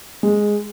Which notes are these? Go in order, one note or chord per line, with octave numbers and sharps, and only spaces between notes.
G#3